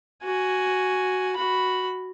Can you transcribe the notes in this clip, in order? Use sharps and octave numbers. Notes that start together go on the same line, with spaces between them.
F#4 G#5
F#4 B5